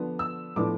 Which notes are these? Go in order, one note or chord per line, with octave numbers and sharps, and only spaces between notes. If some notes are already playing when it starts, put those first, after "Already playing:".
Already playing: D3 F3 B3 D4
E6
A2 F3 B3 D4 D6